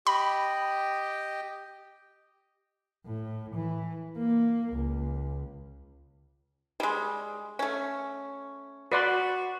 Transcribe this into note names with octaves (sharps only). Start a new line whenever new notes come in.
G4 D#5 G5 B5
A2
E3
A#3
C#2
G3 G#3
A3 C#4
F#4 B4 D5 C6